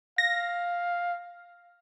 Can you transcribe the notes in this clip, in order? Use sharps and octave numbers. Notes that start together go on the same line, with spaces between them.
F5 A#6